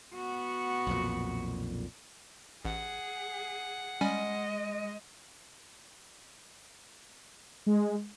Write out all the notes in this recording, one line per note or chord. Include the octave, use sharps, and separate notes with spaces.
B3 F#4
B1 F2 A#2
A1 G#4 F#5
G3 G#3 C#4 D#5 G#5
G#3